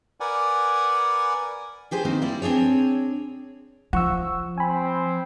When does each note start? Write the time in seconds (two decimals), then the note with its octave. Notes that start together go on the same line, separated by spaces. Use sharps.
0.20 A#4 B4 D5 F#5 G#5
1.91 D4 G4 G#4 C5
2.05 D#3 A#3 C4 D#4
2.22 G3 E4 D5
2.42 C4 D4 G#4 C#5
3.93 F3 F#5 C#6 E6
4.58 C4 G#5 B5